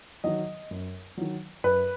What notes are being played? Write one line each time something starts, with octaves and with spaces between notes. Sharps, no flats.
D#3 F#3 D#5
F#2
D#3 F#3
F#2 B4